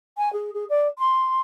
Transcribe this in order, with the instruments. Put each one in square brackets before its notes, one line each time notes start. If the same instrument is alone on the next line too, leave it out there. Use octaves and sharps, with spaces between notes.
[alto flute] G#5
G#4
G#4
D5
C6